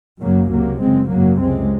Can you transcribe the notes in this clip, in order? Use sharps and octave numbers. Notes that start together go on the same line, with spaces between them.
F#1 F#2 C#3 F#3 A#3
C#2 C3 F#3 A#3
F#1 F#2 C#3 G#3 C4
G#1 F#2 C#3 F#3 A#3
C#2 C3 G#3 C4